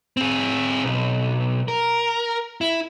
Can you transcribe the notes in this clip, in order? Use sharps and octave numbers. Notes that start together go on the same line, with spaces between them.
C4 G#4
B1
A#4
E4